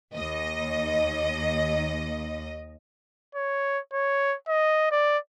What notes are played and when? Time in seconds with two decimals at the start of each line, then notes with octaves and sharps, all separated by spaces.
0.15 D#2 D#5
3.35 C#5
3.93 C#5
4.48 D#5
4.91 D5